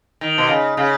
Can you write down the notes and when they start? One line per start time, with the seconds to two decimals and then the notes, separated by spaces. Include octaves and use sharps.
0.21 D#3
0.38 B2
0.48 C#3
0.77 C#3